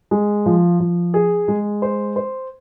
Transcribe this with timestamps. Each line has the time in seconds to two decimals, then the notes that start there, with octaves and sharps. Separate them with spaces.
0.11 G#3
0.46 F3
0.80 F3
1.14 G#4
1.48 G#3
1.82 C5
2.16 C5